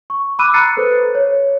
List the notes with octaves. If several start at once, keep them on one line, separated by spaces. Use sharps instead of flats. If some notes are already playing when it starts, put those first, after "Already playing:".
C#6
B5 D6 E6 F#6 D#7
A#5 F#6 A6 C7 C#7
A4 B4 C5
C#5